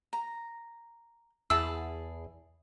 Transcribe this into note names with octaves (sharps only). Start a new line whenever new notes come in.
A#5
E2 E4 G#4 A5 E6